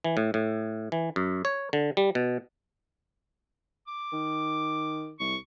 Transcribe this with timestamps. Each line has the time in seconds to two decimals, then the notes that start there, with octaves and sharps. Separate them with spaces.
0.04 E3
0.17 A2
0.34 A2
0.92 E3
1.16 F#2
1.45 C#5
1.73 D3
1.97 G3
2.15 B2
3.88 D6
4.13 D#3
5.20 C2 C#6